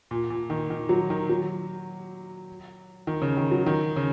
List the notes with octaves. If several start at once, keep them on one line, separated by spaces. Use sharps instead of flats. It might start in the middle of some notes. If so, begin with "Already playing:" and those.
A#2
A#2
D#3
D#3
F#3
D#3
F#3
D#3
C#3
D#3
F#3
D#3
C#3